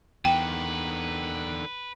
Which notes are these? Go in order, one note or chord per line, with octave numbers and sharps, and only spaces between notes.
E2 D3 D#3 B4 G5